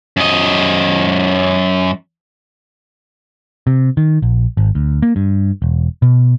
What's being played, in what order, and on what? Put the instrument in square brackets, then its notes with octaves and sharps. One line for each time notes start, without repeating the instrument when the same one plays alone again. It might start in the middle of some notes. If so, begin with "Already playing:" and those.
[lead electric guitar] F#2 D#5
[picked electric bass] C3
D#3
A#1
G#1
D2
A#3
G2
E1
B2